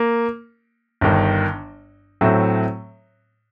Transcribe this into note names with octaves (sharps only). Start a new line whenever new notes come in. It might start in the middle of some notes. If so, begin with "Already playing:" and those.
Already playing: A#3
G1 G2 D#3
A2 F#3 A3 C4